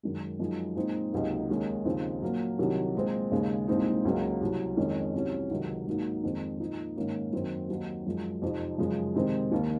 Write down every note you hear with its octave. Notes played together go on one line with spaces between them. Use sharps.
F#2 D#3 G#3
F#2 F3 G#3 D#4
A#2 G#3 C4 D#4
C#2 C3 F#3 A#3 D#4
D#2 D#3 G#3 C#4
D#2 C#3 F3 C4 D#4
A#2 F#3 A#3
C2 C3 D#3 F#3
A#2 G#3 C4
D#2 C#3 G#3
C2 A#2 G#3 C4 D#4
C#2 C#3 F#3 A#3
C2 C3 F#3
F2 D#3 G#3 C#4
C2 C3 F#3 C#4
C#2 C3 D#3 F#3
G#2 F#3 A#3 D#4
F2 D#3 G#3 C4
A#2 F3 A#3 D#4
G#2 D#3 A#3 C#4
F#2 D#3 F#3 C4
D#2 D#3 F#3 C4
F#2 F3 G#3
F2 C3 F3 C4 D#4
F#2 C#3 F3 G#3
C3 D#3 G#3 C4
D#2 D#3 A#3